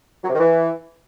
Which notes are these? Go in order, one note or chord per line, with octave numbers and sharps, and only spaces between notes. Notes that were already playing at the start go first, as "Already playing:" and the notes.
F#3
C3
D#3
E3